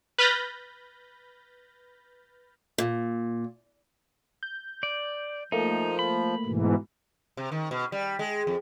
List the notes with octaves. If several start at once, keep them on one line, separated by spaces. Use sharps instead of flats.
B4 B5 F6 G6 A6 A#6
A#2
G6
D5
F3 A3 A#3 D#4
B5
G#2 B2 E3
C3
D#3
B2
G3
G#3
F2